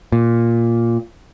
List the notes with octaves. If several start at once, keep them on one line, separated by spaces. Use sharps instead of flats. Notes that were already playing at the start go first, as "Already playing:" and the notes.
A#2